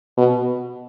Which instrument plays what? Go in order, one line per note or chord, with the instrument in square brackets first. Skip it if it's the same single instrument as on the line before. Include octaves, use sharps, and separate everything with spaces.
[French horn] B2